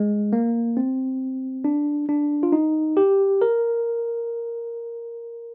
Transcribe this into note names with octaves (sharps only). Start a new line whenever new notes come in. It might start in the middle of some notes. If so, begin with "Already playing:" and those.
Already playing: G#3
A#3
C4
D4
D4
F4
D#4
G4
A#4